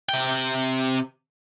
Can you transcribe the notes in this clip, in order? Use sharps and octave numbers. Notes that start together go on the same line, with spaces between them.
C3 G5